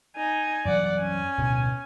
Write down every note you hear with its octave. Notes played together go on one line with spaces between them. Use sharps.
D#4 G#5
F#2 E3 G3 D5 F#5
C#4 G#5
D1 D2 B2